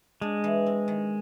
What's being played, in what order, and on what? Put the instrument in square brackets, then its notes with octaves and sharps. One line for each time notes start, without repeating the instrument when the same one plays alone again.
[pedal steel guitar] G#3 [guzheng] D4
[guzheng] E3
C4
D#3